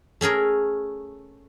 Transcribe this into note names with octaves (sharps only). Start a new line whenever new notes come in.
A3 C#4 G#4 A#4